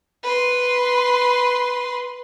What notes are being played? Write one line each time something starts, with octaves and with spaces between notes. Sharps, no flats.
B4 C6